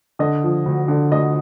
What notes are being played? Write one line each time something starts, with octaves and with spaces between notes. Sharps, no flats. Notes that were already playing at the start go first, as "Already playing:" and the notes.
D3 D#5
F3
D2
D3
D2 D#5